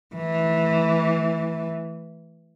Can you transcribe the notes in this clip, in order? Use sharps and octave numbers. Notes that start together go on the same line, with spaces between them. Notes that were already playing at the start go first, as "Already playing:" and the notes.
E3 A3